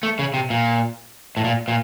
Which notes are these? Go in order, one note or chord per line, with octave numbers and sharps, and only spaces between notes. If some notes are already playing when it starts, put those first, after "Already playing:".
A3
C#3
C3
A#2
A2
A#2
A#2